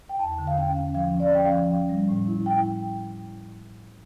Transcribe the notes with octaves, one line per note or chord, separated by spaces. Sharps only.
G5
E2 A5
D3
F5
C#4 G5
C#4
F3 F5
C#4
D5
C#4 G5
F5
F3
C#4
G3
A2
E4
E4 G5